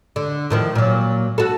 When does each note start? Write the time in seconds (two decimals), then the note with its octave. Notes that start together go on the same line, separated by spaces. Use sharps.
0.16 D3
0.50 A2 D#3 F3
0.76 A#2 F#3
1.38 F#4 A4